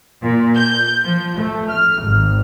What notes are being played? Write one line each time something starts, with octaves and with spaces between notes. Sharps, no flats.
A#2
G6
F3
A3
F6
G#1